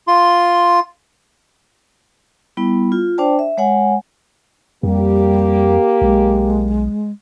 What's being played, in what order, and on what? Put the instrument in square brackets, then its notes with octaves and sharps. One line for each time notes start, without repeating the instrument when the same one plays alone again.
[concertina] F4 C6
[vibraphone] G3 B3 E4
F4
D4 C5 D5 G5 A5
E5
G#3 C#5 F#5 G#5
[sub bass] F2 [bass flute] G3 [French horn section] A#3 G4
[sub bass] B1 [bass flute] G#3